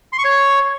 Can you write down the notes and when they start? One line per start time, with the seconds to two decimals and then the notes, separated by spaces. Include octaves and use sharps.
0.13 C6
0.19 C#6
0.25 C#5